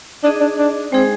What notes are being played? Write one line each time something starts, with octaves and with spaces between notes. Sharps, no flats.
D4 D#4 G#4 D#5
D4
D4
G#3 C4 D#4 G#4 C5